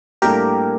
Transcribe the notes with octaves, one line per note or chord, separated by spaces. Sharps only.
A2 G3 A#3 D4 G4 A4 A#4